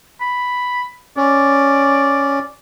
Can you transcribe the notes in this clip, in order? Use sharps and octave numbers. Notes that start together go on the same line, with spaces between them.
B5
C#4 D5